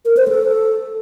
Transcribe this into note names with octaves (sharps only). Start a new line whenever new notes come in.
A#4
C5
A4